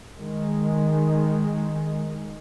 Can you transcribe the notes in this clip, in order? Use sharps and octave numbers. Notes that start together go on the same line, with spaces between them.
D#3 G#3